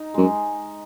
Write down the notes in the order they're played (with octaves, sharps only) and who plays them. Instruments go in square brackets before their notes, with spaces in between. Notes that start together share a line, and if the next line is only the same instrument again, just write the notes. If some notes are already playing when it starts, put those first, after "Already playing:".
Already playing: [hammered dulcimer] D#4
[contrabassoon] F#2 [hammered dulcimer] G#3